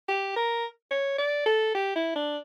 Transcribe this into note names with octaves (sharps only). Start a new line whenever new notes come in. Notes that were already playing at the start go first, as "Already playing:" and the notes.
G4
A#4
C#5
D5
A4
G4
E4
D4